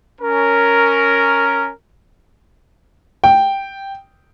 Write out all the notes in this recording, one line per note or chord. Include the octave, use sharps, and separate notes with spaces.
C#4 A#4
G5